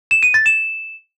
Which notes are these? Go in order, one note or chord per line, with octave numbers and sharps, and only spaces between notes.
E7
D#7
A6
E7